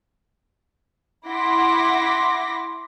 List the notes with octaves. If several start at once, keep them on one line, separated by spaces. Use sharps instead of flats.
E4 F#5 C6 D6 A#6 B6